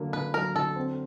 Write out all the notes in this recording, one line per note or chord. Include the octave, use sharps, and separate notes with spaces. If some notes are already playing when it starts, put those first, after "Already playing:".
Already playing: D3 F#3 A#3
D3 B4
F#3 A#4
D3 A4
C4